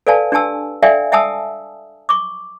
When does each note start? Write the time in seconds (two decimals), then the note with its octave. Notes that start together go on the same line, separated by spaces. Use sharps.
0.07 A4 B4 D5 F5 G#5 A5
0.32 D4 G4 G#5 A5 E6
0.83 A4 D5 E5 F5 G5 G#5
1.12 E5 F#5 G#5 A5 D#6 E6
2.09 C#6 D6